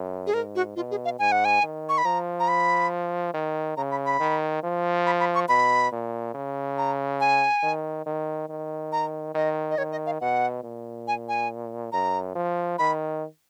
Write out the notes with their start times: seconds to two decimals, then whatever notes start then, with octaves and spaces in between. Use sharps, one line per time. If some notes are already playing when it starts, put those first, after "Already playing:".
Already playing: F#2
0.27 G#4
0.33 G#2 A#4
0.55 F#4
0.76 B2 F4
0.91 G#4
1.05 F5
1.19 G#2 G#5
1.32 F#5
1.45 G#5
1.63 D#3
1.89 C#6
1.98 B5
2.05 F3 A#5
2.40 A#5
2.48 B5
3.34 D#3
3.77 C#3 A#5
3.91 B5
4.06 B5
4.19 D#3
4.63 F3
5.06 B5
5.20 B5
5.35 C#6
5.49 B2 B5
5.92 A#2
6.34 C#3
6.78 A#5
7.20 G#5
7.63 D#3
8.06 D#3
8.49 D#3
8.92 A#5
9.35 D#3 D#5
9.71 D#5
9.78 D#3 C#5
9.92 D#5
10.06 F5
10.21 B2 F#5
10.63 A#2
11.07 G#5
11.29 G#5
11.92 F#2 A#5
12.35 F3
12.78 D#3 B5